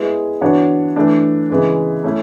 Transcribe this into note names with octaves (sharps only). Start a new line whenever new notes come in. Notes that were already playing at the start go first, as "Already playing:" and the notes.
Already playing: G#3 B3 E4 G#4
E3 B3 D4 F#4 C#5
E3 A3 D4
C#3 E3 G#3 B3
A3 C#4 E4